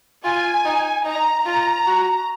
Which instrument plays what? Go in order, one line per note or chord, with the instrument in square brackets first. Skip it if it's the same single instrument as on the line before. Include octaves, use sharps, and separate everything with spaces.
[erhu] F4 [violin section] G#5
[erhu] D#4
[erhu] D#4 [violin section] A#5
[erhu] F4 [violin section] A#5
[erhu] F#4